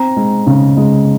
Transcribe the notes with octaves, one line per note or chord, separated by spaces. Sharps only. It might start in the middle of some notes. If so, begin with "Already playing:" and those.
Already playing: C4 A#5
G#3
C#3
G#3